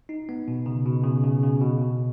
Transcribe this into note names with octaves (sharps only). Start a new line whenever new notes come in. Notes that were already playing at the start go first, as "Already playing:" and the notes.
D#4
B3
B2
C#3
B2
C#3
C#3
C#3
B2